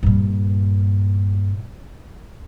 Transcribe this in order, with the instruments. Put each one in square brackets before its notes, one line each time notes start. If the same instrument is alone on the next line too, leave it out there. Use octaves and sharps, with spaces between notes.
[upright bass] G2 A#2